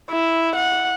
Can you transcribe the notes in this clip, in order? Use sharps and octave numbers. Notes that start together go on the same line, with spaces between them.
E4
F#5